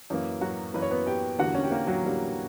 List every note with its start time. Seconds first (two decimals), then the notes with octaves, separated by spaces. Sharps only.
0.10 F#2 E3 A#3
0.41 F#3 F#4
0.74 F#2 E3 A#3 B4
0.82 C#5
0.91 B3 B4
1.06 G4 G5
1.38 E2 D3 G3 A#3 F#4 F#5
1.55 C#4 C#5
1.63 G4
1.71 A#3 A#4
1.87 F#3 F#4
2.03 E2 D3 G3 A#3 G4